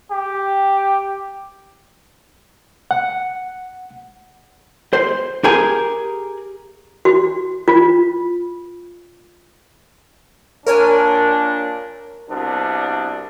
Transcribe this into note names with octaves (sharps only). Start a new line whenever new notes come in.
G4
F#5
C5
G4 G#4 A#4 G#5
F#4
F4
A#2 D4 A#4 C#5 G#5
C2 B2 D4